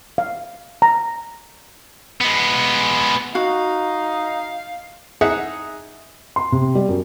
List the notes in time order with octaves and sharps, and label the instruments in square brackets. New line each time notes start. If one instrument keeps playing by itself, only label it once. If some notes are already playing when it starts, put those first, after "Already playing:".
[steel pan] F5
A#5
[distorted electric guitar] G#3 B3
[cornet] D#4 [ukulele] F#4 [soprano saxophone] F5
[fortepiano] D#4 G#4 E5 F#5
[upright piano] C6
C3
G3
F#2